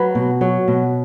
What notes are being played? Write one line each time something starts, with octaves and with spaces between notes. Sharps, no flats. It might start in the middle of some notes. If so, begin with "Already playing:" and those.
Already playing: F#3 B4
B2
F#3 C#5
B2